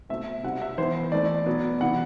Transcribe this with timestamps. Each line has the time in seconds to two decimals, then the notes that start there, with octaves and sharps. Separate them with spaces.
0.09 B2 A3 C4 E5
0.43 C3 G3 C4 F#5
0.62 E5
0.78 E3 B3 C5
1.12 E3 A3 C4 D5
1.46 B2 F#3 B3
1.80 C3 E3 B3 F#5